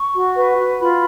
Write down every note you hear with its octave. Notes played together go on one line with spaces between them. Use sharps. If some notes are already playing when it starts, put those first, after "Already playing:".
Already playing: C#6
F#4
B4
F#4
F4 B5